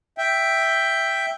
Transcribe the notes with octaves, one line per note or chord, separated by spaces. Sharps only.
E5 G5